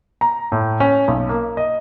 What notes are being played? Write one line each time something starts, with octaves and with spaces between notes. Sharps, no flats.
A#5
A2
C#4
B1
A#3
D#5